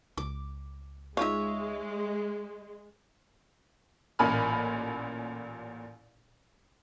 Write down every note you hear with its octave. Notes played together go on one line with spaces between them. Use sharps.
C#2 D6
G#3 D#4 F4 C#5 E5 F5
A1 A#2 G#5 B5 F6